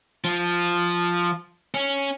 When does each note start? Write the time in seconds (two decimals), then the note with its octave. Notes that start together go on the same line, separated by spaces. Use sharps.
0.24 F3
1.74 C#4